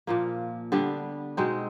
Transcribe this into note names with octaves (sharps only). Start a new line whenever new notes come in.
A#2 F3 A#3
D3 G3 B3 D4
B2 G#3 C4 D#4